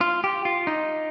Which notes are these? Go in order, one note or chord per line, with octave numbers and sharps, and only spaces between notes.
F4
G4
F4
D#4